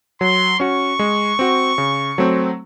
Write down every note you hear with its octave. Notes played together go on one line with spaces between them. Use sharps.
F#3 C6
C#4 F#4 C#6
G#3
C4 F#4
C#3
F#3 A3 C4